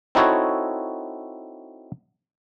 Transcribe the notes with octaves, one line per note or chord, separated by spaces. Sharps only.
C4 D#4 E4 F#4 A4 C#5